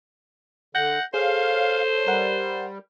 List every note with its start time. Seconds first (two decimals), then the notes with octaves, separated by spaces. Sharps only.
0.75 D3 F#5 G6 A#6
1.14 G#4 A4 C5 C#5 F5
2.07 G3 A#4 F#5